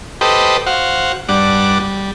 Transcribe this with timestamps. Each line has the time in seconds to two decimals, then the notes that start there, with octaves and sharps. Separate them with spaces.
0.21 G4 A4 B4 C5 D#5
0.67 F#4 C5 F5 F#5
1.29 G2 G3 D4 F#5 D6
1.80 G3